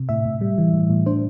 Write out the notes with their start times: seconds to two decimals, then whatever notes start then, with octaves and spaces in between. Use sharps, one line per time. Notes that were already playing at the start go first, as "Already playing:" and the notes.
Already playing: C3
0.09 A2 E5
0.25 A2
0.41 G3
0.58 E3
0.74 A2
0.90 A2
1.06 D4 C5